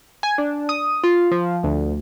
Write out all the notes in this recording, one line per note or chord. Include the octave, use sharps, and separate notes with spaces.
G#5
D4
D#6
F4
F3
D2